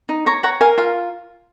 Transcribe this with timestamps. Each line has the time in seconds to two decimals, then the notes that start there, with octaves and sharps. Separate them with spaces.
0.09 D#4
0.26 C#5 A#5 C#6
0.43 C#5 F#5 A#5
0.61 A#4 F5 G#5
0.78 F4 F5